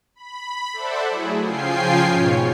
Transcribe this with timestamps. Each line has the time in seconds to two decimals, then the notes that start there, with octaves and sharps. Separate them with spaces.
0.15 B5
0.73 A4 C5 D5 E5 F#5
1.11 F#3 A3 E4 G#4
1.43 C#3 F3 F4 G5 G#5 C7
2.08 G#2 B2 C#5